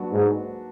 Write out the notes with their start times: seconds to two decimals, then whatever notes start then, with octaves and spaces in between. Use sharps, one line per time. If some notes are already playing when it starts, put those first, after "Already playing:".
Already playing: F#3 A#3 D4 F#4 B4
0.12 G#2